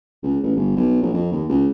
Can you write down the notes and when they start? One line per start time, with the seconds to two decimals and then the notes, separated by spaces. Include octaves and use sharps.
0.23 C#2
0.43 A1
0.56 G1
0.77 B1
1.02 A#1
1.14 F2
1.32 D#2
1.49 C#2